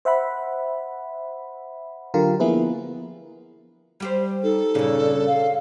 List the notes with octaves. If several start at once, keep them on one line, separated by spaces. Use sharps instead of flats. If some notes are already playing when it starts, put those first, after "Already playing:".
C5 E5 F#5 B5
D3 F#3 F4 G4 A#4
F3 A#3 B3 E4 G#4 B4
G3 G4 C5
D#4 A4
G2 A#2 C#3
F5